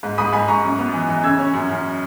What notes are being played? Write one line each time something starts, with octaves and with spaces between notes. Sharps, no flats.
G#2
G#2 B5 D#6
G#2 G#5 B5
G#2 A#5 C#6
F#2
B3
E3
E3
C#3 E6 G#6
C#4
F#2
F#2